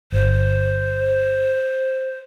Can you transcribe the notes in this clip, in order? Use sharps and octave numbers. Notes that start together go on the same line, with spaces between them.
G1 C5